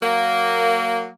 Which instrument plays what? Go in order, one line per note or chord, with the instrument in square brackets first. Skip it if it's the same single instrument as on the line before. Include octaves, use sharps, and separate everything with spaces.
[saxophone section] F#3 A#3